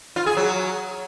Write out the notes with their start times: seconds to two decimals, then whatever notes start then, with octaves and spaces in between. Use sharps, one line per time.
0.16 F4
0.26 G#4
0.37 F#3